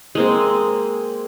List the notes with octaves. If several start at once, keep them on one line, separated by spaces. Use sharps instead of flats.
G#3 A#3 C4